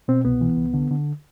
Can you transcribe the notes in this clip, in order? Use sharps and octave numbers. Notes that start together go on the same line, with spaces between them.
B2 C4
C2 B3
E3
C2
D3
D3